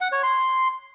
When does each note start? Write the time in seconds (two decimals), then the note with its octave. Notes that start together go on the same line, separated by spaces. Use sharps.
0.01 F#5
0.12 C#5
0.23 C6